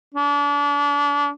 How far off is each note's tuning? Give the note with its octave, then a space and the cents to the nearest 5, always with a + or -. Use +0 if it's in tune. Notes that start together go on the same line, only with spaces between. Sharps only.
D4 -35